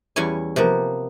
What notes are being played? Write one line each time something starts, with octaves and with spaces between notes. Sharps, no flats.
E2 G3 C#4 E4 C#5 G#5
C3 F3 A#3 B3